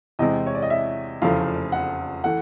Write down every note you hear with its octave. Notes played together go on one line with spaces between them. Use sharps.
E2 C3 E3 G#3 C4 D#5
C#5
D5
D#5
E5
F1 E2 C#3 F3 A3 F5
F#5
E3 A3 F#5